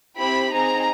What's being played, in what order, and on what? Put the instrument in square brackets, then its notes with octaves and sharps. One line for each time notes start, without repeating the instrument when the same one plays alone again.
[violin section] C4 E4 G4 B5
C4 D#4 G#4 A#5